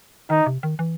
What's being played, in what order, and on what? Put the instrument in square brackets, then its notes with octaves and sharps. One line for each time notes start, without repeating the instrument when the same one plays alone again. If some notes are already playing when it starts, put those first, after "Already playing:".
[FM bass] D#3 [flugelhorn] D#4
[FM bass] C3
D#3
E3